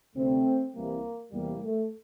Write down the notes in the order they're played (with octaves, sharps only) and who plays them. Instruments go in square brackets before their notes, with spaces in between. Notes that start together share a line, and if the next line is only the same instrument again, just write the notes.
[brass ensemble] D2 C3 G3 A3 C4
C2 C3 E3 G3 A#3
E2 C3 G3 A#3
A3